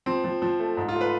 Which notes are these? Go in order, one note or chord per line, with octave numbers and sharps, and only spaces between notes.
F3 C4
F3
F3
A3
G#2
F4
A3
B4